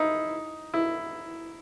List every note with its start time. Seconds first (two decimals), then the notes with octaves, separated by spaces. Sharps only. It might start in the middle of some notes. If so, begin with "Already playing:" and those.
Already playing: D#4 E4
0.74 E4